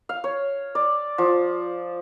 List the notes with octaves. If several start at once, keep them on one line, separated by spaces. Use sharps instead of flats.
F5
C#5
D5
F3